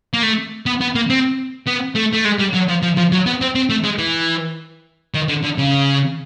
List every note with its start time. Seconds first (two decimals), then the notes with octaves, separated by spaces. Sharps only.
0.14 A#3
0.23 A3
0.66 B3
0.81 B3
0.95 A#3
1.10 C4
1.67 B3
1.96 A3
2.14 A3
2.25 G#3
2.39 G3
2.54 F#3
2.69 F3
2.83 F3
2.97 F3
3.12 F#3
3.26 B3
3.41 C4
3.55 C4
3.70 A3
3.84 G#3
3.99 E3
5.14 D#3
5.28 D3
5.43 D3
5.58 C#3